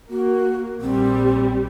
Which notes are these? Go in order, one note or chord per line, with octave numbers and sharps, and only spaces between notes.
A#3 F#4
A#1 G3 C4